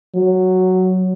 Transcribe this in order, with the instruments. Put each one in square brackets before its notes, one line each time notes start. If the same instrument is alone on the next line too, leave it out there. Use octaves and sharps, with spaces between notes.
[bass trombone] F#3